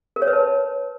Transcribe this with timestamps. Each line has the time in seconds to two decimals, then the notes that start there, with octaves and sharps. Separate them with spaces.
0.16 A#4
0.22 C#5
0.28 B4
0.33 A5